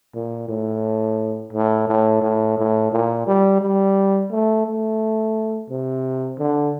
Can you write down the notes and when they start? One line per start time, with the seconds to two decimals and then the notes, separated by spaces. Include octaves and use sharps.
0.14 A#2
0.48 A2
1.53 A2
1.88 A2
2.22 A2
2.58 A2
2.92 A#2
3.27 G3
3.61 G3
4.31 A3
4.66 A3
5.70 C3
6.39 D3